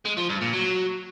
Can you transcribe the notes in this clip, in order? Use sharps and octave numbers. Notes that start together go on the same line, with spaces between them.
G#3
F3
G2
A#2
F#3